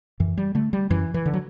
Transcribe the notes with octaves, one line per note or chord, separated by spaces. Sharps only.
F#2 E3
G3
D3 A3
G3
F#2 E3
E3
D3
F#3